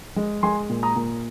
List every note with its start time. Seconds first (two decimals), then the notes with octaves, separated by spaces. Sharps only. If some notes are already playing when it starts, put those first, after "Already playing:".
0.16 G#3
0.43 G#3 G#5 C6
0.70 A#2
0.83 A#5 D#6
0.96 A#2